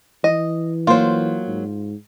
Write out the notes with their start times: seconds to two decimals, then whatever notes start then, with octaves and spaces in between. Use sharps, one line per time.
0.24 E3 D#5
0.87 F#3 A#3 F4 C5
1.47 G#2